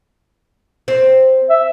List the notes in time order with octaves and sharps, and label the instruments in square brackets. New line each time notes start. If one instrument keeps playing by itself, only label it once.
[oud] C4
[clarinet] E5